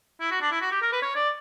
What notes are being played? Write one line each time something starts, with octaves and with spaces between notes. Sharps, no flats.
E4
F#4
D4
E4
F#4
G4
A#4
B4
C#5
D5